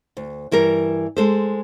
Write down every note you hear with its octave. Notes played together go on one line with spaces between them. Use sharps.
D2
G2 E3 G3 A#4
G#3 A4 C5